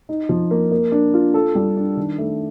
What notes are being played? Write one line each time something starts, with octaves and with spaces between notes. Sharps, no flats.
D#4
F3
A#3
A#3
D4
F4
A4
G3
D4
D#3
A3